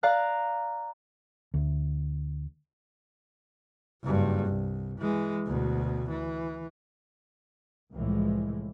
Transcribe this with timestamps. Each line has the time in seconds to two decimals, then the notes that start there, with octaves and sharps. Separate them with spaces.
0.03 D5 F5 A#5 F#6
1.54 D2
4.03 F#1 G2
4.46 C2
4.99 E3 G#3
5.46 D2 B2
6.10 E3
7.93 C2 A2 E3 F3 G#3